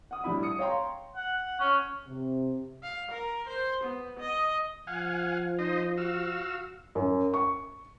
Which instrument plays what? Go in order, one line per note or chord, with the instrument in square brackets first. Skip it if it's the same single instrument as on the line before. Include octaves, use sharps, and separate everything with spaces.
[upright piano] F#5 D#6
A2 G3 D4 E4 B5
D#6 C#7
C#5 F5 G5 A#5 C6
[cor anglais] F#5
C#4
[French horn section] C3
[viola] F5
A#4
C5
B3
D#5
[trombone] F3 [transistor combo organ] F5 F#5 G#5
[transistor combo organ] D#4 C5 D#5
F#4 F5 E6
[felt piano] F#2
C#6